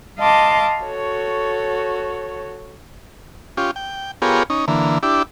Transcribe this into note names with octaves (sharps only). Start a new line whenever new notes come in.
D#5 F5 A5 C6 D6
F#4 A4 C#5
C#4 F4 G4
G5
B3 F4 G4 G#4 A#4 C#5
C#4 D#4
D3 E3 A#3
D4 E4 G4